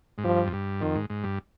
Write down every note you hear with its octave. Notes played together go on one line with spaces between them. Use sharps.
G#2
G2 F3
F2
G2
F2 D#3
G#2
G#2
G2